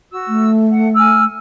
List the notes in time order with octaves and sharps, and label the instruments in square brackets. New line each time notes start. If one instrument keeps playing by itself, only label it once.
[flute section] F#4 E6
[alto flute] A3
[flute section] F#5
G#5 E6 F6